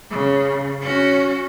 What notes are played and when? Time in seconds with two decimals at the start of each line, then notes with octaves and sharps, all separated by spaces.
0.10 C#3
0.81 C#4 F#4